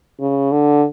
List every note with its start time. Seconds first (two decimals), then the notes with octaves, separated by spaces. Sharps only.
0.20 C#3
0.52 D3